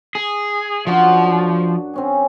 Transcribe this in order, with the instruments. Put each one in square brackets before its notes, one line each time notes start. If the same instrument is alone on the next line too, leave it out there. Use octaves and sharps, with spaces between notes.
[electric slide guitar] G#4
[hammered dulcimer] F#2 D4 F#4 [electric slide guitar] F3
[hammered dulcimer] C4 C#4 G#4